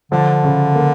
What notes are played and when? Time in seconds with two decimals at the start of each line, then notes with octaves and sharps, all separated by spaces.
0.12 D3 F3
0.44 C#3
0.75 A#3